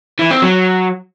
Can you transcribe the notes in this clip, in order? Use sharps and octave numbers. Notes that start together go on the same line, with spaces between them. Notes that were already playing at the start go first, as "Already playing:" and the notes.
E3
C4
F#3